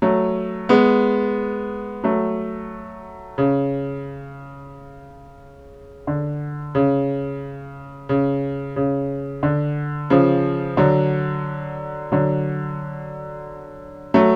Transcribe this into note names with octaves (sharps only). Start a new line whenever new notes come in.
F#3 A3
G#3 B3
F#3 A3
C#3
D3
C#3
C#3
C#3
D3
C#3 F3
D3 F#3
D3 F#3
F#3 A3